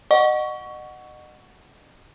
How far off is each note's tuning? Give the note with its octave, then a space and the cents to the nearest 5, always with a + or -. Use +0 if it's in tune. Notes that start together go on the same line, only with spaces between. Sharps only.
D#5 -30 F#5 +0 C#6 +15